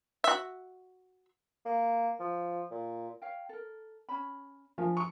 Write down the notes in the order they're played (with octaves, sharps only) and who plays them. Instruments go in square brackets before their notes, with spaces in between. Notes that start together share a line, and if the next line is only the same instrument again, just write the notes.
[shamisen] F#4 E5
[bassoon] A#3
F3
A#2
[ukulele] C#5 F5 G5
A4 A#4
C#4 C#5 B5
[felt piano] F3 [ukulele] D4 A#4 G#5
[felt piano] C#6